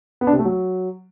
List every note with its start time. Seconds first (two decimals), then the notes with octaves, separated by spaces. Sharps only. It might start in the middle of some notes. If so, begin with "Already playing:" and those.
0.21 B3
0.27 D4
0.33 C3
0.39 A3
0.45 F#3